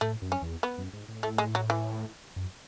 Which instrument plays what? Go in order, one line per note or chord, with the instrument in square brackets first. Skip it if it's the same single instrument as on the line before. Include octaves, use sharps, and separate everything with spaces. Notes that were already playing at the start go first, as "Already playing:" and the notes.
[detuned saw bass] A2 [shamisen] A3
[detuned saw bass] F#2
[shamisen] C#4
[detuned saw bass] E2
[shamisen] B3
[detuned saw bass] F#2
G#2
A2
[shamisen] A3
G#3
F#3
E3
[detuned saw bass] F#2